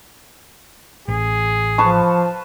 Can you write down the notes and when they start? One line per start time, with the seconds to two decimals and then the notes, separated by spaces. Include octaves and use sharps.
1.08 A1 G#4
1.78 F3 B4 A5 C#6